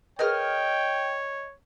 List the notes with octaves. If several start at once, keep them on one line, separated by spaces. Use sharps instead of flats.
G#4 A#4 B4 C#5 D#5 G5 F6